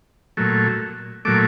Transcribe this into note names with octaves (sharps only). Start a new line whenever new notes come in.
A#2 F#3 A3
A#2 F#3 A3 D6